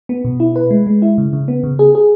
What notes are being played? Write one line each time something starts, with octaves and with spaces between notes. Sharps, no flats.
B3
B2
E4
B4
G#3
G#3
E4
C#3
C#3
B3
C#3
G#4
G#4